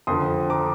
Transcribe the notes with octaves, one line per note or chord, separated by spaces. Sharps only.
F2 D3 F3 C6 D#6
A#5 D6